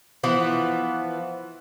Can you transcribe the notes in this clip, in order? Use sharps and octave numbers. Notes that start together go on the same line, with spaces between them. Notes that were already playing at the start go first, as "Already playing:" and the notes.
E3 F3 B3